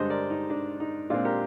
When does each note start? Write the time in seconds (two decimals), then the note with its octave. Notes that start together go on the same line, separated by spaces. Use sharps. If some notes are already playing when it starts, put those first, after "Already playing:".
Already playing: G2 D3 G#3 C5 D#5
0.10 A#4 D5
0.30 D#4
0.50 D4
0.80 D#4
1.10 A#2 G#3 C4 D4 F4
1.25 G4 A#4